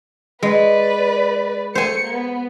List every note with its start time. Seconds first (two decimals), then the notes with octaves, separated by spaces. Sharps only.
0.42 G#3 B4 D5
1.75 A3 C5 G#5 C#7
2.04 B3